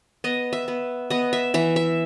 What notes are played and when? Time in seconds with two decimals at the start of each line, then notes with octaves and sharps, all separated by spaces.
0.24 B3 D#5
0.53 E5
0.68 B3
1.10 B3 D#5
1.33 E5
1.54 E3 E5
1.76 E5